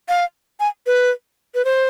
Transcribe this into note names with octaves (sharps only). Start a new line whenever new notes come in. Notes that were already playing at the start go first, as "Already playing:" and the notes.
F5
G#5
B4
B4
C5